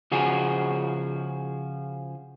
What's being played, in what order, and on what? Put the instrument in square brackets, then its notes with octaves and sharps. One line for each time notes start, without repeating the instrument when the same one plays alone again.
[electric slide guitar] C#3 F3 F#4 G#4